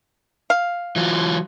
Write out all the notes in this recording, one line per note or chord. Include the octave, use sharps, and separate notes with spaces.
F5
E3 F#3 F4